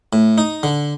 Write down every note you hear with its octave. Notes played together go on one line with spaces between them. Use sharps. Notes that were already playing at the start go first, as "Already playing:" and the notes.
A2
D#4
D3